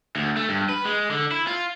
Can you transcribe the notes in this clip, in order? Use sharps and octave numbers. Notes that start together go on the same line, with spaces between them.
D2
A3
G2
B4
G#3
D3
E4
F4